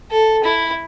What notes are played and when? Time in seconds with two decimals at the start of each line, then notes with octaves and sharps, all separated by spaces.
0.11 A4
0.44 E4